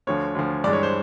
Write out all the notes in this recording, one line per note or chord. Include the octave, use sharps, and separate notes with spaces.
D2 D3 F3 C#5
D2 D3 F3
G2 E3 G#3 D5
C#5
C5